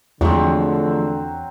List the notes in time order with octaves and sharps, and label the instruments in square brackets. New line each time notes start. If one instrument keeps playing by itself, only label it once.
[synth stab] E2 [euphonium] D3 [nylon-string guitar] F3 G#3 A3 [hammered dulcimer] F#3 C4